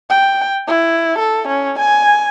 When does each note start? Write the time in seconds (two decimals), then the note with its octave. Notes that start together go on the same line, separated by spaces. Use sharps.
0.10 G5
0.67 E4
1.19 A4
1.48 C#4
1.80 G#5